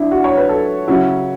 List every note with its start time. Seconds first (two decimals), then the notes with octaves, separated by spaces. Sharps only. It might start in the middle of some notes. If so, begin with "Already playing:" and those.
Already playing: D3 D4 E4
0.11 F#4
0.24 C#5
0.37 B4
0.49 A4
0.88 C#3 F#3 C#4 E4 F#4